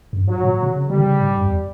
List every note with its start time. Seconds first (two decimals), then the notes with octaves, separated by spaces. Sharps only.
0.13 F#2
0.20 G2
0.28 G#2 F#3
0.44 A#2
0.63 C3
0.75 C#3
0.90 D3 G3
1.00 C3
1.05 C#3
1.20 G#2
1.36 F#2
1.46 E2